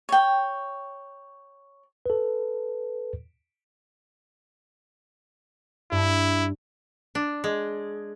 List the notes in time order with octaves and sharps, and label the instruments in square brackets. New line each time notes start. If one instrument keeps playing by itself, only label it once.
[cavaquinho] C#5 G5
[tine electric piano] A4 B4
[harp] G2 [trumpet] E4
[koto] D4
G#3